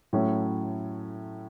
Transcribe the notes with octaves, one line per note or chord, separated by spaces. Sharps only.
A2 F#3 A3 C#4